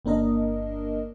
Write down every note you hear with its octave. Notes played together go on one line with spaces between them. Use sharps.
G1 A#3 D4 A#4 D#5